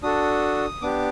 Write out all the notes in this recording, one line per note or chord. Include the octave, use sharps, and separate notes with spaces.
D4 F#4 A4 D#6
B3 D4 G4 D6